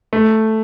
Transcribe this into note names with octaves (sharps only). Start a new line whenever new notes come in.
A3